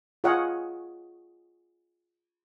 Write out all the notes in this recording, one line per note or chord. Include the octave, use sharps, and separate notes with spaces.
F4 G#4 C#5 D#5 F5 F#5